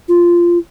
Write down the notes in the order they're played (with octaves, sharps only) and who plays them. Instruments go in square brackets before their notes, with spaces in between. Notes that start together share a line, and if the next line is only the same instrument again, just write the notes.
[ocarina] F4